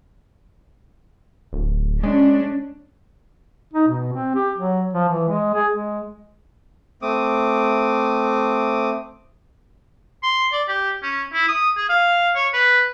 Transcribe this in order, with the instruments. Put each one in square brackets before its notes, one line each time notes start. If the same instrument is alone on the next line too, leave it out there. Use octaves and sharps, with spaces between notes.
[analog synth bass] D1
[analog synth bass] G#3 [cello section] C#4 D4
[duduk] D#4
B2
C4
G4
F#3
F3
E3
G#3
G#4
G#3
[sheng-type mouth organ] A3 C4 D6 D#6
[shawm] C6
D5
G4
C#4
E4
D#6
G#4
F5
C#5
B4